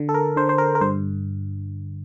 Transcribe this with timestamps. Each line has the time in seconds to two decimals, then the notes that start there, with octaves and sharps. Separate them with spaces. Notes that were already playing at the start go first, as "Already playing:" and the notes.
Already playing: D3
0.09 A4
0.14 A#4
0.36 D3 C5
0.49 C5
0.58 A#4
0.75 A#4
0.81 G2 C5